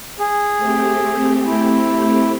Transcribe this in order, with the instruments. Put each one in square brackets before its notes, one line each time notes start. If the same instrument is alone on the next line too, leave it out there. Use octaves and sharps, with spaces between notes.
[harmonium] G#4
[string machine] A3 C4 G4
[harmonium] E4